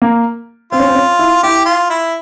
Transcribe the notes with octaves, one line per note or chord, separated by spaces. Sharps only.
A#3
C4 F4
C#4
C4
C#4
E4
E4 G4
F4
E4